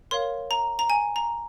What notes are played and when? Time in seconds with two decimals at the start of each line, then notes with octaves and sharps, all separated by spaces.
0.11 A#4 C#5 F5 C6
0.51 A#5
0.79 A#5
0.90 G#5
1.16 A#5